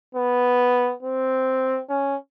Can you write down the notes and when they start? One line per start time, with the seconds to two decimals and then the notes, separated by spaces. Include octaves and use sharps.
0.15 B3
1.03 C4
1.89 C#4